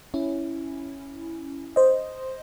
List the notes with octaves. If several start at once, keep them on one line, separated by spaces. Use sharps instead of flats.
C#4 E4
C5 D#5